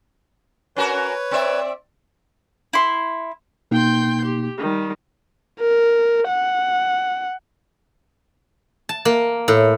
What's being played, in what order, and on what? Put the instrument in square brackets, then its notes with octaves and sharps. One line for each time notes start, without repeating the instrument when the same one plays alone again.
[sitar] C#4 F#4 A#4 [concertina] B4 C#5
[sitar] C4 D5 E5
[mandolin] E4 C6
[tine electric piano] B2 A#3 D#4 [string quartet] G5 C6 G6
[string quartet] G4
D#3 G3
[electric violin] A#4
F#5
[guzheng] A5
A#3
A2